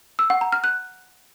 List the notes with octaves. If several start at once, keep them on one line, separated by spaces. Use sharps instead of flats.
E6
F#5
A#5
F6
F#6